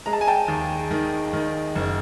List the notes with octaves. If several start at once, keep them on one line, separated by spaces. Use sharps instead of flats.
G#3 A#5
A5
G#5
G5 A5
D#2
D#3
D#3
F#1